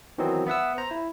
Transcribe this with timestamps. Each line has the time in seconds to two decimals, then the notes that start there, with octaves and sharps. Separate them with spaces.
0.18 D#3 E3 F#3 B3 C4
0.47 B3 E5 F#5 E6
0.78 C5 A#5
0.91 E4